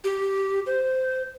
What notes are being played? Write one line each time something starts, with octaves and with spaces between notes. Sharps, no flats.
G4
C5